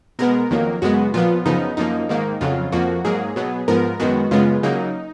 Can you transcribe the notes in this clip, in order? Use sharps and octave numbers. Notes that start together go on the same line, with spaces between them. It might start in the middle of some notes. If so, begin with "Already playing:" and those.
B2 G#3 B3 A#4
F2 D#3 F#3 A#3
F#2 C#3 G#3 B3 F#4
A#2 F3 B3 F4
F#2 C#3 F3 B3 D#4
F#2 F3 A#3 D#4
G#2 D#3 A#3
F2 C#3 F#3 F4
F2 F3 A#3 F#4
G#2 F#3 A#3 G#4
B2 F#3 B3
G#2 F3 B3 A#4
F#2 D#3 G#3 B3 F#4
F#2 C#3 G#3 B3 F4
C#3 F#3 A#3 D#4